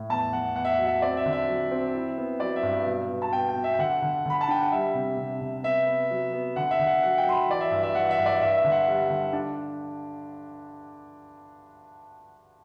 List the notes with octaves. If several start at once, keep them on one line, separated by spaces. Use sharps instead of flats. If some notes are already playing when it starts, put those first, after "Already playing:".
Already playing: A2
E2 A5
E2 F#5
E2 F#5
E5
F#5
F#3
E5
C4 D5
E5
D3
E5
F#3
C4
E4
B3
F#3 D5
E5
G2
B2
B2
A5
B2 G5
G5
B2
E5
G5
D3 F#5
D3
D3 B5
A5
D4 G5
F#5
G3 E5
C3
C3
C3
B3 E5
B3
F#3
B3
D3 F#5
E5
D3
F#5
F#3 F#5
G5
F#3 C6
B5
E3 D5
E5
G2 E5
E5
E3 F#5
E5
G2
D5
G2 E5
E5
D3
F#5
G3
D3
D4